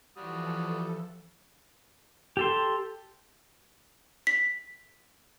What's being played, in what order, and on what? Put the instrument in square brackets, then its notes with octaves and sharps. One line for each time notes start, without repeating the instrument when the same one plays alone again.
[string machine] E3 F3 A4 [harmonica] G3 F#4 D#6
[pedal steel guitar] G4 A4 C6
[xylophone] B6